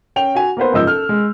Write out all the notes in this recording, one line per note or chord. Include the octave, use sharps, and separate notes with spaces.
C#4 G5 F7
F#4 G#5
A#3 B3 B4 C5
F#1 G#2 F3 D#5 E6 G6
A4 F6
G#3